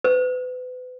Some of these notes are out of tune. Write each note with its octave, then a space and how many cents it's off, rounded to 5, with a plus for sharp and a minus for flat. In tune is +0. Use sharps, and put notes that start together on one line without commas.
B4 +35